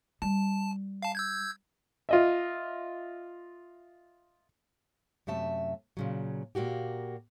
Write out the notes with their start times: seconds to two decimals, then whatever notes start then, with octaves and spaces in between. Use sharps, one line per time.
0.22 G3 A5
1.02 F5 A5
1.15 E6 G6 G#6
2.09 F4 D#5 E5
5.27 F#2 C3 A3 E5 A5
5.97 A#2 C#3 F#3
6.55 A#2 A#3 F#4 G4